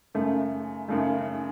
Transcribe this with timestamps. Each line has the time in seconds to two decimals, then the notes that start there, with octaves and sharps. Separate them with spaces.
0.14 F#2 C#3 A3
0.89 F#2 C#3 A3